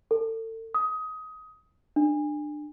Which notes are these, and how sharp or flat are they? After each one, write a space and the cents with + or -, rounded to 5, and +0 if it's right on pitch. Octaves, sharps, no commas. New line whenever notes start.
A4 +35
D#6 +20
D4 +25